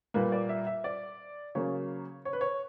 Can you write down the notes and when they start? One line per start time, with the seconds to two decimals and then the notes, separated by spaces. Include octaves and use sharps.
0.14 A#2 G3 A#3 B4
0.32 D5
0.49 E5
0.67 E5
0.84 D5
1.55 C#3 F#3 A#3 C#5
2.25 C#5
2.33 B4
2.41 C#5